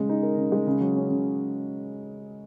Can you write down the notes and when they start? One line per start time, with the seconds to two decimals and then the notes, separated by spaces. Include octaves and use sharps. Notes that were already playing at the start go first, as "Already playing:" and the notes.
Already playing: C#3 G#3
0.09 D#4
0.23 A#4
0.37 C#3
0.52 G#3
0.67 C#3
0.80 F#3
0.96 C#4
1.10 C#3